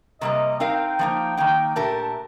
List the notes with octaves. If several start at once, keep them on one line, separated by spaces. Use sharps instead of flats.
C3 G3 A#3 D#5
C4 D#4 A#4 F5 G5
F3 A#3 D#4
D#3 A#3 D#4 G5
A#2 A3 D4 G4 A#4 A5